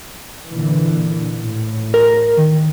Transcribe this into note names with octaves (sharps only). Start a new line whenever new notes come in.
A#2 D3 E3
A2
A#4
D#3